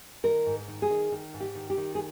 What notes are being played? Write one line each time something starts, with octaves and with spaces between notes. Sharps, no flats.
D#3 A#4
G#2
D#3
G#4
D#3
D#3
G#2
G4
D#3
G4
D#3
G#4